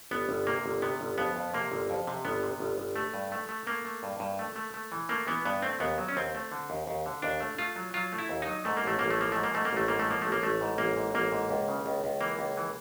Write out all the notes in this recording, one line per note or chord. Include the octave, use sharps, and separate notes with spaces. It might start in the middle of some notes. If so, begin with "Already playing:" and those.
G1 B3
G1
C3 A#3
G1
C3 B3
G1
F2 B3
F2
C3 A#3
G1
F2
C3
G1 B3
C3
G1
G1
A3
G2
A3
A3
A3 A#3
A3
G2
G2
A3
A3
A3
E3
A3 A#3
E3 B3
G2 B3
A3 C4
D#2 B3
F#3
C#4
D#2 C4
A3
D3
D#2
D#2
D3
D#2 D4
A3
A3 F4
F#3
F#3 F4
A3
E4
D#2
F#3 D#4
G#2 A3
A#3
A1 A3
A1 A#3
A3
F3 A#3
G#2 A3
A#3
G#2 A3
A#3
A1 A3
G#2 A#3
A3
F3 A#3
A1 A3
A#3
A1 A3
G#2
A1 A#3
G#2
A1 A#3
G#2
C#2
C#3
C#2
C#2
E3 A#3
C#2
E3